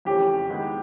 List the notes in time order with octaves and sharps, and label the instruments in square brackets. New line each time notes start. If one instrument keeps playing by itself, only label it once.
[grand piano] F2 C#3 E3 A3 C#4 [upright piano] G4
[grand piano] D#3 G#3 B3 E4 G4